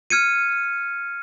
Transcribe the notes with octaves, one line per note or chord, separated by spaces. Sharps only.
F6 G#6 C#7 D#7